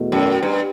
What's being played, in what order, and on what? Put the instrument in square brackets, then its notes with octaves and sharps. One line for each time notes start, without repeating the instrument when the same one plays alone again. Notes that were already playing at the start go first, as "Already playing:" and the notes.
Already playing: [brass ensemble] E2 B2 A3
[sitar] F#2
G2